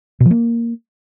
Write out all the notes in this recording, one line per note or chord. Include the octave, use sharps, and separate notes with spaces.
B2
F3
A#3